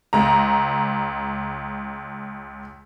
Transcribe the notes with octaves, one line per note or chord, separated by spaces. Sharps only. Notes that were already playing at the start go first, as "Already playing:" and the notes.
C#2 A#5